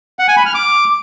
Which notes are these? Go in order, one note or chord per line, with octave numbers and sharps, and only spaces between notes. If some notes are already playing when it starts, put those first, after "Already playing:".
F#5
G#5
B5
F6
D6